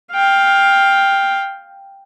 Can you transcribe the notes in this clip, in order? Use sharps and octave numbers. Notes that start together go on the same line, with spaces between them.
F5 G5